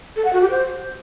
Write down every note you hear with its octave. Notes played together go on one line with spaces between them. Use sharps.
A4
F#5
F#4
G4
C5